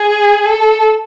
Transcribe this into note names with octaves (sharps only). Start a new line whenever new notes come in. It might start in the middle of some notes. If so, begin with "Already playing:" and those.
Already playing: G#4
A4